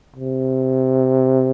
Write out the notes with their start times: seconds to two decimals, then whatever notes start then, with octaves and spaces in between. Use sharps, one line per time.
0.16 C3